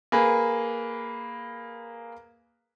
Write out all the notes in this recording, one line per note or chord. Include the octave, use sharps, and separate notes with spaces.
A#3 G#4 B4